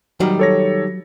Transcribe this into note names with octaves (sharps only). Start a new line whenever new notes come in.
D#3 F#3 G3
A4 C#5 A#6